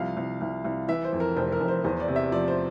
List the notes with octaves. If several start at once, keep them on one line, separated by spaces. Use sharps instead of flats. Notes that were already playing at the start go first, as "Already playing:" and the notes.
Already playing: C2 F3 F5
C2
C2
C2
E3 E5
C5
F2
A#4
F1 C5
A#4
F1
C5
E2 C5
D5
C3
E5
F3 D5
C5